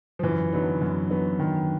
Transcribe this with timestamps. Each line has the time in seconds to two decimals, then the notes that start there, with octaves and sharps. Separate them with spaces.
0.19 F3
0.23 F#2 E3
0.53 D3 F#3 B3 D#4
0.82 F#2
1.10 D3 F#3 B3 D#4
1.39 F#2 D#3